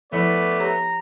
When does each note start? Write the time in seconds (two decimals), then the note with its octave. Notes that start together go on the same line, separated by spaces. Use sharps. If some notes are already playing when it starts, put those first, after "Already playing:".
0.13 F3 A3 B3 E4 D5 B5
0.60 G4 C#5 A#5